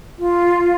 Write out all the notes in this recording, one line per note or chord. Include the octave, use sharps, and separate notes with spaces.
F4